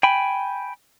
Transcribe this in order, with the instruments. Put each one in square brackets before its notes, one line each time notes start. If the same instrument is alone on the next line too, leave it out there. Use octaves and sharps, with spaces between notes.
[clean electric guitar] G5 G#5 B5